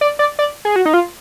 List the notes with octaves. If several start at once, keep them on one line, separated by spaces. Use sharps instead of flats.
D5
D5
D5
G#4
F#4
D#4
F4